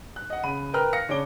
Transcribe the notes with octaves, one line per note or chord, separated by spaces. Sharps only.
F#6
D#5 F#5
C#3 B5 D#7
A#4 B4 G5 A#5 F6 F#6
F5 F6 A#6 C#7
C#3 D4 C#5 D6 D7 G7